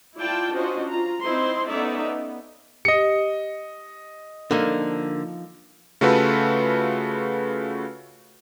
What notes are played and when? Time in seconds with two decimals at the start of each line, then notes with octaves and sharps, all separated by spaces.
0.17 E4 F4 D5 G5 A5
0.54 C#4 D4 F4 F#4 C5 D#5
0.88 F4 A#5
1.23 C4 D#4 E4 C5 C6
1.69 B3 C#4 D#4 A4 D5 E5
2.03 B3
2.85 G4 D#5 C#7
4.51 D3 F3 A#3 D#4
6.01 C#3 A3 F4 F#4 A4 B4